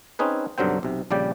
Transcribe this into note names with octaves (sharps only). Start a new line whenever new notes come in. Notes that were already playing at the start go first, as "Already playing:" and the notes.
C4 C#4 D#4 G#4 B4
B1 G2 D3 F#3 C4 G5
B1 C3
A#1 C#3 G3 D5 G5